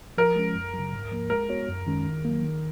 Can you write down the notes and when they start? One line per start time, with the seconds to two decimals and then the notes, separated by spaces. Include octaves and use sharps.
0.18 F3 A#4
0.36 G#3 C#4
0.55 F#2
0.74 C#3 F#3
0.93 G#2
1.12 F3 A#3
1.30 G#3 A#4
1.49 B3 F#4 C#5
1.68 F#2
1.87 D#3 G#3 C#4
2.05 D#3
2.25 F#3 A#3
2.42 D#3